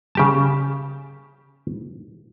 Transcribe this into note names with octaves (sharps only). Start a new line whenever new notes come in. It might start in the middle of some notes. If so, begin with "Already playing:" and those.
C#3 G4 A5